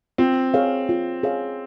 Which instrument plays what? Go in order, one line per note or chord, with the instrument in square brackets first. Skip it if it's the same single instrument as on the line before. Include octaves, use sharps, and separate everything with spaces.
[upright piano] C4 [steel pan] F4
[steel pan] G#4 C#5 F5
F4
G#4 C#5 F5